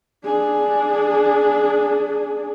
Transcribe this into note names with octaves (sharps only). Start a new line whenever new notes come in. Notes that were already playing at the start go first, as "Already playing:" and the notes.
D4 G#4